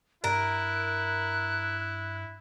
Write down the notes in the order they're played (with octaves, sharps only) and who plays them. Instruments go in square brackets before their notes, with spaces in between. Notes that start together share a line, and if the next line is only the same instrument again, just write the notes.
[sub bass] G2 [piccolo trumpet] E4 [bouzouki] A#4 [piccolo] F#6